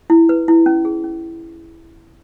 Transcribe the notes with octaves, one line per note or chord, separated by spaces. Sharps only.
E4
B4
E4
C#4
G#4
C#4